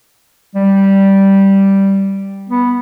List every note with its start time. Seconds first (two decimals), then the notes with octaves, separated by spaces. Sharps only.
0.55 G3
2.50 B3